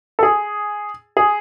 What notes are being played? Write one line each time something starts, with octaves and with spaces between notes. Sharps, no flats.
A4
G#4
G#4